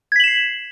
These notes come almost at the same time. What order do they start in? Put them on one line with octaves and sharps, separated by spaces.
G#6 B6 F#7 E7 C7